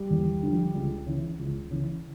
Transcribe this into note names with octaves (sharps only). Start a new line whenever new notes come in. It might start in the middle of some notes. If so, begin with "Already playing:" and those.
Already playing: G3
E2
D3 F3
C#2
C#3 E3
C#2
C#3 E3